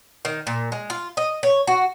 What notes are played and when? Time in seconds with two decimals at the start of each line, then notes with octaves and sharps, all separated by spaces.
0.25 D#3
0.47 A#2
0.72 G#3
0.90 F4
1.17 D#5
1.43 C#5
1.67 F#4